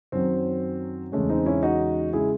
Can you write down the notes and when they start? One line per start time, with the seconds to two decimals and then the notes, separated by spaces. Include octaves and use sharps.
0.12 F#2 D#3 F#3 C4
1.12 E2 C#3 G#3 A3 C#4
1.30 C4 D#4
1.46 C#4 E4
1.63 D#4 F#4
2.13 C#3 G#3 E4 G#4